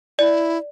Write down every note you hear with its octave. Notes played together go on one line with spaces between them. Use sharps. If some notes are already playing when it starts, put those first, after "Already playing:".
E4 D5